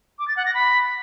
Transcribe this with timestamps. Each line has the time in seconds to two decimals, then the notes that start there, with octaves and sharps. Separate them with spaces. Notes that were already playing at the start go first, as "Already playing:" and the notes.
0.19 D6
0.28 A6
0.37 F#5
0.45 A#6
0.54 B5